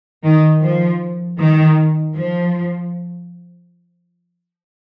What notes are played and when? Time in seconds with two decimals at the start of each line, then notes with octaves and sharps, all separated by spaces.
0.24 D#3
0.63 F3
1.39 D#3
2.16 F3